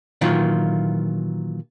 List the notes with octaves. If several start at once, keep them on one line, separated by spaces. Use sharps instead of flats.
A#2 D#3 E3 F#3 A#3 F4